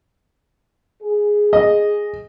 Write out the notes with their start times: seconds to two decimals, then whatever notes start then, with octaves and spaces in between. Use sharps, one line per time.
1.02 G#4
1.53 D#5